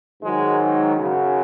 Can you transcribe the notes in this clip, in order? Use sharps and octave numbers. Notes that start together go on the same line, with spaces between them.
G#2 D#3 F#3 G#3
F#2 C#3 F#3